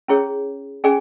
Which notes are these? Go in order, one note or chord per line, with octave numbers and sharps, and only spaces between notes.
C#4 E4 G#4 C#5
C#4 G#4 D5 G#5